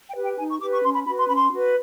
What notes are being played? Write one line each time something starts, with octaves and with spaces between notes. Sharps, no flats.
G5
G4 B4
G5
D#4 G#5
C#6
G4 B4 D6
C#6
C#4 C6
B5
F#4 B4 B5
C6
C#4 B5
C6
F#4 B4